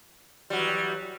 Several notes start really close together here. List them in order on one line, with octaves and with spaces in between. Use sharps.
G3 F#3 E3